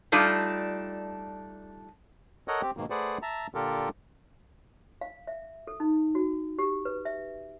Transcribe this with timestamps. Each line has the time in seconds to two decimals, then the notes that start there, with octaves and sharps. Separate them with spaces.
0.12 G3 A3 D4 D#4 F4
2.48 A4 A#4 C#5 D#5 F#5
2.62 C4 G4
2.77 G#2 B2 D#3 A#3
2.90 A3 G#4 B4 C5 D5 F#5
3.22 E5 A5 A#5
3.55 A#2 D3 F4 G4 A4 A#4
5.01 F5
5.27 E5
5.67 A4
5.80 D#4
6.15 F#4
6.59 G4
6.85 B4
7.05 E5